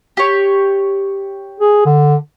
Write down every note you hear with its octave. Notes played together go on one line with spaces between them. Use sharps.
G4 C#5
G#4
D3